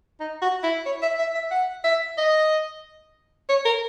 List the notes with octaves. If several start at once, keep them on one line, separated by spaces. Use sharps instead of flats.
D#4
F#4
E4
C#5
E5
E5
E5
F#5
E5
D#5
C#5
A#4